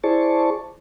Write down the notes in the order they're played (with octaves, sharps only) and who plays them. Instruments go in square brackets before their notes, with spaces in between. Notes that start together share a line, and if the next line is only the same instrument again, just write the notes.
[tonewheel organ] E4 G#4 C5 D5 A5 C#6